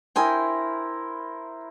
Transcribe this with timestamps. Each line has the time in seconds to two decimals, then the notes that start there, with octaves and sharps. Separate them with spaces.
0.16 E4 A#4 C5 G5 G#5 D#6